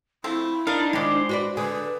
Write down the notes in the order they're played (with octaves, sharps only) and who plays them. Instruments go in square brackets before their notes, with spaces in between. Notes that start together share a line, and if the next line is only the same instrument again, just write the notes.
[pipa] F3 A3 C4 [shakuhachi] E4
[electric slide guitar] D4 D#4 [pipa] A#4 F5
[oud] D#3 D4 [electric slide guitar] G#3 C5 [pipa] D#4
[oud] F#4 B4 D5
[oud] D3 [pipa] G#4 [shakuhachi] B4